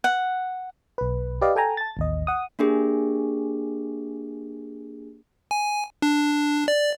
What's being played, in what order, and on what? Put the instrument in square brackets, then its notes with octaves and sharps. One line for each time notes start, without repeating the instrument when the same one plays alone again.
[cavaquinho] F#5
[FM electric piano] B1 B4
G4 B4 D5 D#5 F5
A4 G5 G#5 A#5
A5 A6
A1 D#2 D#5
F#5 D#6
[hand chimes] A#3 D4 G4 G#4
[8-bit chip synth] G#5
D4
D5